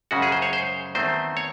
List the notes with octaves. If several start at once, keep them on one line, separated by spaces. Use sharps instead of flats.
F#2 C#3 G#3 C#4 F#4
G#4
C5
C#5
C5
E2 D#3 A3 C4 C5
C#5